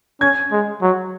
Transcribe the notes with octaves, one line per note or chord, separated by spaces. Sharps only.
C#4 G#6
G#3
F#3